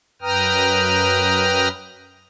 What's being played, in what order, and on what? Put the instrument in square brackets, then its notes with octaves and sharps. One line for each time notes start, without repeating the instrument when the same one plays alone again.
[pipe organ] F#2 B4 G5 A#5 D#6 F6